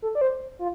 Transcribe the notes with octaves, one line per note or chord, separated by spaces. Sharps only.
A4
D5
C5
F4